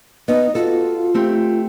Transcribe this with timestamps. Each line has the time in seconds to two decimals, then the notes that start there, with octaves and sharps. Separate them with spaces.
0.28 B3 D#4 D#5
0.55 F4 F#4 A4
1.14 A3 C4 G4